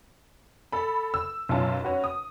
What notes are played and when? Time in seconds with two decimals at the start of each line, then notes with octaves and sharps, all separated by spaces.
0.72 A4 B5
1.14 E6
1.49 B1 F#2 C#4 F4 A5
1.83 C#4 F#4 B4
2.04 D#6